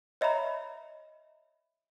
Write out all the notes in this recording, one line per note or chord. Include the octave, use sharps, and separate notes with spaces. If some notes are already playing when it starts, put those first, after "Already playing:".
C#5 D#5 E5 A#5 B5